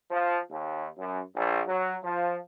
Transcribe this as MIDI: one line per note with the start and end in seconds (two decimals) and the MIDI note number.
0.10 0.38 53
0.51 0.86 39
0.98 1.21 42
1.35 1.60 34
1.67 1.94 54
2.02 2.37 53